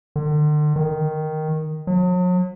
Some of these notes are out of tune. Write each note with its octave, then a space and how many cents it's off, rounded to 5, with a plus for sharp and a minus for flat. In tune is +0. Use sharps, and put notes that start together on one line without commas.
D3 +40
D#3 +0
F#3 -40